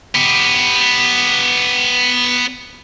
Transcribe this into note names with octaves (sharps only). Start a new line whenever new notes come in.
B3 G4